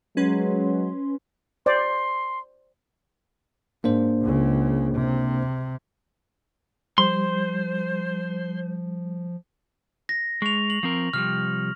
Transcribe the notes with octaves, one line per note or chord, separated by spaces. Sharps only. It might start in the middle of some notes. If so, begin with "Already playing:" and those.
F#3 G#3 C#4 B4 C6
C5 D5 C6
G#2 A#3 D4 C5
C#2 C#3
C3
F3 G3 C5 C6
A#6
G#3 C#6 F7
F#7
F3 C4 A#4
C3 F3 G3 F6